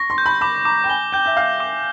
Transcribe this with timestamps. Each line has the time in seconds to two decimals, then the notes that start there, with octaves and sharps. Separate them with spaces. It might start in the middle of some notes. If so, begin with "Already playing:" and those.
Already playing: C#6 A#6
0.10 C6
0.18 G6
0.26 B5
0.41 B5 D6
0.65 A#5 D6
0.84 G5
0.89 G#5 G7
1.12 G5 G6
1.26 E5
1.37 F5 G6
1.60 D6